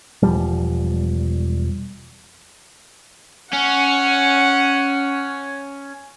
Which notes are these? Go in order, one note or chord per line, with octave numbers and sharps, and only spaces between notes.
E1 F3 G3
C#4 F#5